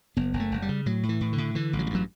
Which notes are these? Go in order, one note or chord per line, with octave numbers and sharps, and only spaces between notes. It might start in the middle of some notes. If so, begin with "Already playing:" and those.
F#1 B3
F#1
A3
F#1
G3
C#3
A2 F#3
A2
E3
A2
D3
A2
D3 E3
A1
F#3
G3
G2 F#3